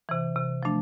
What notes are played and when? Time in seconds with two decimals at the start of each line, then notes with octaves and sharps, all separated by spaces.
0.09 C3 E3
0.36 C3
0.63 F3 A3 D4